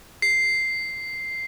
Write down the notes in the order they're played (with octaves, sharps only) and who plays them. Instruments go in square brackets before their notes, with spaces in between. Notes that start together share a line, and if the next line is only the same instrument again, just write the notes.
[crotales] C7